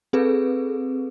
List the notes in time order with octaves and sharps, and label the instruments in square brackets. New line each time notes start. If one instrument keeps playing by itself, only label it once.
[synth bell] C4 G#4 A4 B4